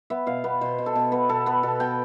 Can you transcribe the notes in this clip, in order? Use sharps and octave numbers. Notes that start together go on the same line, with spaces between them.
B3 E5
B2 F5
B3 B4
B2 C5
B2
A4
B2
B3 B4
B2 A4
B3 B4
B2 A4
B2 G5